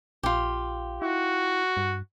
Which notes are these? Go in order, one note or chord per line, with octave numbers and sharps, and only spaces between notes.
A#1 F4 G4
E4 F#4
G2